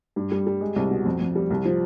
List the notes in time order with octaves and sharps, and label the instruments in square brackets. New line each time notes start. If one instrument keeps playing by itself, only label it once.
[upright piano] G2
G3
G3
G#3
C2
B2
F2
F2
G3
C2
F3